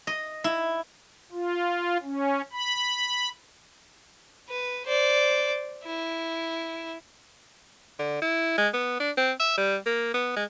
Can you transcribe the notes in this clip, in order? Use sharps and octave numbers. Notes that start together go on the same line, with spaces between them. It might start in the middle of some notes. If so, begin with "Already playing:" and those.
D#5
E4
F4
C#4
B5
B4
C5 D5
E4
D3
E4
G#3
B3
D4
C4
E5
G3
A#3
B3
G#3